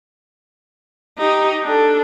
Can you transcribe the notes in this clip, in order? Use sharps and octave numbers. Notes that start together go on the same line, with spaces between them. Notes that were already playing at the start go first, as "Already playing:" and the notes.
D#4 G4
D4 A4